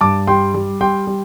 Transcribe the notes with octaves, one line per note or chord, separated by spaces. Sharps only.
G2 A5 D6
G3 G5 C6
G3
G3 G5 C6
G3